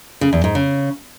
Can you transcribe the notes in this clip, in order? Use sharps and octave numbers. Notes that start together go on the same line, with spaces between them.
C#3
E2
G#2
C#3